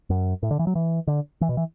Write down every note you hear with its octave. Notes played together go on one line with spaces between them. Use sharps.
F#2
A2
D3
E3
F#3
E3
D3
E3
B2
E3